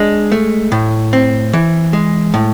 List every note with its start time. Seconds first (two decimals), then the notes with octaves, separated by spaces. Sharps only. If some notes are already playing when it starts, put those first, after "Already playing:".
Already playing: G#3 D4
0.32 A3
0.72 A2
1.13 C4
1.53 E3
1.93 G#3
2.34 A2